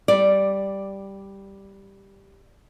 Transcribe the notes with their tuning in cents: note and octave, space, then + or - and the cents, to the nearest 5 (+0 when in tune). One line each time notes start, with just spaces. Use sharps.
G3 +0 D5 +0